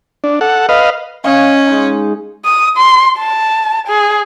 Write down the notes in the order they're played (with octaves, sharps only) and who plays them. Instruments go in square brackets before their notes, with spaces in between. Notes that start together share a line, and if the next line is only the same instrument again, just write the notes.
[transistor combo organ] D4
A4 F#5
B4 D#5 F5
[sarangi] C#4 [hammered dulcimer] D#5 F5 C#6
[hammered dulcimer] G#3 D#4
[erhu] D#6
C6
A5
G#4